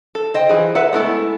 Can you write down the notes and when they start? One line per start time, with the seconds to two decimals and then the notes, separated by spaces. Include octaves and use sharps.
0.15 A4
0.34 C5 D#5 G5
0.49 E3 F4 G#4
0.75 A4 B4 E5 F#5
0.93 G#3 A3 B3 E4 A4